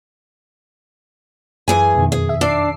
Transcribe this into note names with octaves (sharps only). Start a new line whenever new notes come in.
F#2 E3 G#4 G#5
F2 B2 D#3
G#4
E5
D4 D6 E6 C7